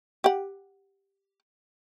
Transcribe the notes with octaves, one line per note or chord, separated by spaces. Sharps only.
G4 F#5